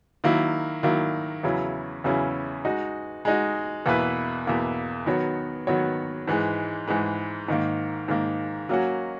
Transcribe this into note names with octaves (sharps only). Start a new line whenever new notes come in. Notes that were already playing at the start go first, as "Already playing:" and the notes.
D#3 F#3 A#3 E4
D#3 F#3 A#3 E4
E2 C#3 F#3 C#4 E4
E2 C#3 F#3 C#4 E4
G#3 D#4 F#4
G#3 D#4 F#4
E2 B2 A#3 E4 B4
E2 B2 A#3 E4 B4
D#3 F#3 B3 F#4 C#5
D#3 F#3 B3 F#4 C#5
G#2 E3 G#3
G#2 E3 G#3
G#2 D#3 A#3
G#2 D#3 A#3
F#3 A#3 C#4 F#4